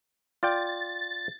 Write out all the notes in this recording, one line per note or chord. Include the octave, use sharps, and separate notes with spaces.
F4 D5 G5 A6